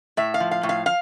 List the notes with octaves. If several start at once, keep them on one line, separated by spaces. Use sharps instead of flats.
A2 E5
F5
F3
F5
A2
F5
F5